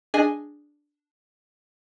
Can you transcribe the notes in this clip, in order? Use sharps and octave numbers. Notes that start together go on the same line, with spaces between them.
D4 G#4 D#5 G#5